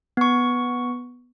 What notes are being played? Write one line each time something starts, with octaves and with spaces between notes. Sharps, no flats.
B3 C#6